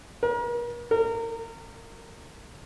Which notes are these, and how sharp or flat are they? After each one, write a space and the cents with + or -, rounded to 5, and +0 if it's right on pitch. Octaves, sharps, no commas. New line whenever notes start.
A#4 +40
A#4 -25